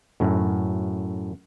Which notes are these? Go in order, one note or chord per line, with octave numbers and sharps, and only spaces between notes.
F#2 A2